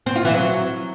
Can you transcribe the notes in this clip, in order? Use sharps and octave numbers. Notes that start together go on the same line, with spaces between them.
C4
F4
E3
F#3